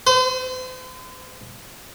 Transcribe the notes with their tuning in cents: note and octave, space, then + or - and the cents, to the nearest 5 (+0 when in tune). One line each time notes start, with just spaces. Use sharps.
C5 -40